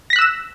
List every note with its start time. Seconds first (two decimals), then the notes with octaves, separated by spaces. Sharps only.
0.10 A#6
0.13 B6
0.16 F#6
0.19 E6
0.22 E7